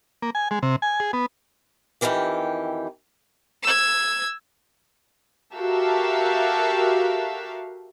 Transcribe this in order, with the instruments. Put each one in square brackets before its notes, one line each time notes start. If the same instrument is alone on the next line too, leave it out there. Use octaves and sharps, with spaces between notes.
[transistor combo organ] A#3
G#5
G#3
C3
G#5
G#4
B3
[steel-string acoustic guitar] F2 G#2 D#3 E3 G4
[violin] E6 G#6
[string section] F#4 G4 A4 A#4 E5 F5